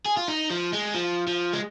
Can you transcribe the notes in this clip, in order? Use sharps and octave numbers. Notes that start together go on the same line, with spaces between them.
G#4
F4
D#4
F3
G#3
F3
F3
G#3